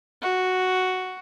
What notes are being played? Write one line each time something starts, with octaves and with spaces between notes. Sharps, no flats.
F#4